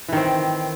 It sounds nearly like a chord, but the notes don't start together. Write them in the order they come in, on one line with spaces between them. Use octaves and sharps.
E3 D#3 C4